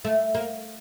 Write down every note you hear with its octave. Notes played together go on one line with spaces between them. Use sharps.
A3
A#3